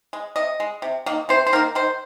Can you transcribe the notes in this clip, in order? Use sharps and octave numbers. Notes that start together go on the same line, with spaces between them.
G#3
C3 D#5
G#3
C3
D#3 A#3
C3 C5
C5
D#3 A#3 A#4
D#3 C5